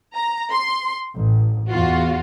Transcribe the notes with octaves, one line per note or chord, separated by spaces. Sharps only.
A#5
C6
A1
E2 F4 F#4